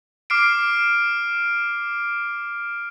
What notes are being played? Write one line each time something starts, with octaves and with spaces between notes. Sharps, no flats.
D6 F6 C7 D7